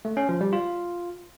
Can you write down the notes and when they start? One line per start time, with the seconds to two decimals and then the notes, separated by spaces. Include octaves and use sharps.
0.05 A3
0.17 C#4
0.29 F3
0.41 G3
0.53 F4